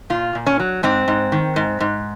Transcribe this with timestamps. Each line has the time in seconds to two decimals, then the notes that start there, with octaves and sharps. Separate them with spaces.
0.10 A#2 F4
0.35 A#2
0.47 C#4
0.59 F#3
0.83 G#2 C4
1.08 G#2
1.32 D#3
1.56 G#2
1.80 G#2